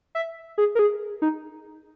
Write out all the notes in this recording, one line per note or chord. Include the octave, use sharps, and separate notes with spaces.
E5
G#4
A#4
G#4
D#4